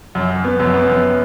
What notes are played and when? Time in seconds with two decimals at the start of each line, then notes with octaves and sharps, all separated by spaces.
0.15 F#2
0.30 F#2
0.44 B3
0.60 F#2
0.74 B3
0.89 F#2